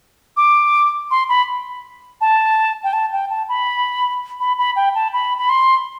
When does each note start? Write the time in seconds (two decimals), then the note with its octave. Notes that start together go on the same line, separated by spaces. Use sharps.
0.37 D6
1.11 C6
1.29 B5
2.21 A5
2.84 G5
2.93 A5
3.13 G5
3.30 A5
3.49 B5
4.40 B5
4.58 B5
4.76 G5
4.95 A5
5.13 B5
5.38 B5
5.49 C6